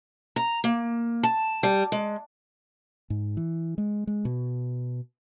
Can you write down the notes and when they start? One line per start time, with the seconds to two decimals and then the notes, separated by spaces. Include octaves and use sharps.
0.36 A#5
0.64 A#3
1.23 A5
1.63 G3
1.92 G#3
3.10 G#2
3.37 E3
3.78 G#3
4.07 G#3
4.25 B2